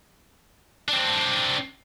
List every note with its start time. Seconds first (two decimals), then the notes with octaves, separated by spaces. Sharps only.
0.89 C4 D4